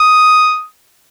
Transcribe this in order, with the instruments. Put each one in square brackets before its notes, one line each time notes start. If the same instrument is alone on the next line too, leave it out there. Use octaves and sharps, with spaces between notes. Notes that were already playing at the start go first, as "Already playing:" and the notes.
Already playing: [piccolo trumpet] D#6